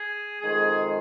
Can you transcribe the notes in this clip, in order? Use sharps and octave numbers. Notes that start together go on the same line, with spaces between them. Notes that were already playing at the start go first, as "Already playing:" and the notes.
Already playing: G#4
F2 D#3 G#3 G#4